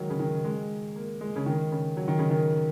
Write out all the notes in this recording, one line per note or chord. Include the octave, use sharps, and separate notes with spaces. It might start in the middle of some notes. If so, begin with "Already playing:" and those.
Already playing: D#3 F#3 G#3
C#3
D#3
G#3
A#3
G#3
C#3
D#3
C#3
F#3
D#3
C#3
D#3